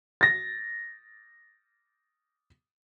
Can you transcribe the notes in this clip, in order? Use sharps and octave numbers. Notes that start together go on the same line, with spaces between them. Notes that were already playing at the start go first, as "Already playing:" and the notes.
A6 A#6